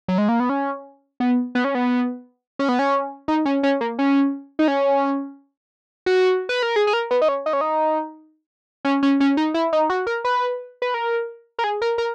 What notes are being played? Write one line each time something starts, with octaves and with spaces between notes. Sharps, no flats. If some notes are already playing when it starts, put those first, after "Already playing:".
F#3
G#3
A#3
B3
C#4
B3
B3
C#4
B3
C#4
B3
C#4
D#4
C#4
C#4
A#3
C#4
D#4
C#4
F#4
B4
A#4
G#4
G#4
A#4
B3
D#4
C#4
D#4
C#4
D#4
C#4
C#4
C#4
D#4
E4
D#4
F#4
A#4
B4
B4
A#4
A#4
G#4
A#4
A#4